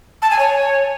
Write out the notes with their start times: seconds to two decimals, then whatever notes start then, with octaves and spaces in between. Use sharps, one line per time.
0.22 A5
0.31 G#5
0.39 C#5